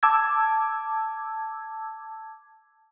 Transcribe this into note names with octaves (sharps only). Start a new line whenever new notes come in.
A5 D6 E6 G#6